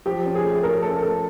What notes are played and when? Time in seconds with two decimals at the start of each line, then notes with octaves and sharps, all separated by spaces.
0.06 F3 G4
0.26 C#4
0.35 G#4
0.44 A3
0.63 C#4 A#4
0.82 A3 A4
1.02 A3 A4